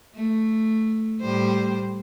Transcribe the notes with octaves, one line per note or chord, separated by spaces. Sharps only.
A3
A2 G3 C5